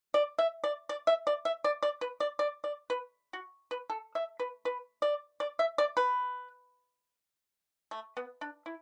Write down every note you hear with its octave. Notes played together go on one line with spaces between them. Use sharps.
D5
E5
D5
D5
E5
D5
E5
D5
D5
B4
D5
D5
D5
B4
F#4
B4
A4
E5
B4
B4
D5
D5
E5
D5
B4
A3
B3
D4
E4